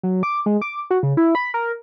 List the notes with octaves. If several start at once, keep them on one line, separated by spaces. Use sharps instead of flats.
F#3
D6
G#3
D6
F#4
C#3
E4
B5
A#4